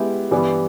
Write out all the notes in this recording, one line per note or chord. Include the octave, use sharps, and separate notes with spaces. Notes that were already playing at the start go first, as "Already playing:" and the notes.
Already playing: G#3 B3 E4 G4
G2 E3 G3 B3